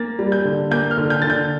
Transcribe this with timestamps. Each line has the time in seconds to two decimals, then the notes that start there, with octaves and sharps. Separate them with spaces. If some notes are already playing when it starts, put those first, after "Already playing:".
Already playing: A#3 A6
0.19 G3
0.32 G6
0.45 D3
0.71 A#3 G6
0.91 F6
0.97 D3
1.10 G6
1.22 D3 A6
1.30 G6